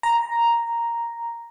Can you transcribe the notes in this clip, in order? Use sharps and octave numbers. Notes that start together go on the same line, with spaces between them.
A#5